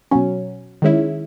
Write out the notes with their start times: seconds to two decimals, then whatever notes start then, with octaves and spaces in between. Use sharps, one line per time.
0.11 B2 F#3 C#4
0.82 D#3 G#3 C#4 E4